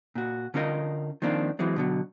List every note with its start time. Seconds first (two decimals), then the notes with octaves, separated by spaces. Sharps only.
0.15 A#2 F#4
0.54 D3 C#4 F4 A#4 D#5
1.22 D#3 F3 A#3 C4 D4
1.59 E3 F#3 G#3 C4
1.76 B2 D3 F#3